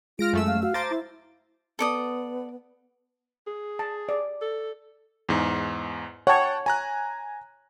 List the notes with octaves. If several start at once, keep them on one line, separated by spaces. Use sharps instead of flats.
G#3 F4 F6 A#6 D7
F#2 A3 E6
F5
F#4 F5
C5 A5 A#5 D6 A6
E4
B3 A4 D5 D#6
G#4
A5
D5
A4
E2 G#2
C#5 F#5 G5 A5
G#5 A#5 F#6